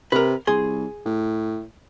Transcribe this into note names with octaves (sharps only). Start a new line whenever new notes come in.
C3 A#4 B4
C2 G#4 C6
A2